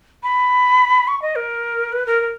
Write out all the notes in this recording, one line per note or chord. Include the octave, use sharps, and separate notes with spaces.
B5
C#6
D#5
A#4
B4
A#4
A#4